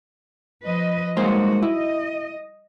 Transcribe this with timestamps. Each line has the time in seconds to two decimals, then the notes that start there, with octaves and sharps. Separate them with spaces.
0.65 F3 B4 D#5
1.17 G3 G#3 A#3 D#4 F#4 C5
1.63 E4 D#5